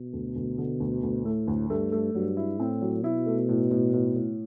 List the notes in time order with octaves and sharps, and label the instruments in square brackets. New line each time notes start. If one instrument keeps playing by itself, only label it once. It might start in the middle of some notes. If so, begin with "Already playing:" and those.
Already playing: [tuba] B2
[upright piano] D2
D2
D3
D2
D2
[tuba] A2 [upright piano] A3
[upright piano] D2
[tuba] G2 [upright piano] A3
[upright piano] A3
[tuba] G2 [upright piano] F#3
[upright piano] E4
[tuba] A2 [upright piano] C4
[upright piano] F#3
[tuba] B2 [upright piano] E4
[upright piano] A3
A2
A2
A2
A2